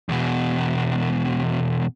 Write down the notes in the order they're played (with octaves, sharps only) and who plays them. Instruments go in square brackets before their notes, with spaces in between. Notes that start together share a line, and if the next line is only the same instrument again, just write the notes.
[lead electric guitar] E2 B2